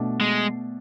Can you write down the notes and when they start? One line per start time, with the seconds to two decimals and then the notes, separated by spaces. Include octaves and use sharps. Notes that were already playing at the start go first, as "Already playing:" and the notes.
Already playing: B2 A3 D4
0.21 G#3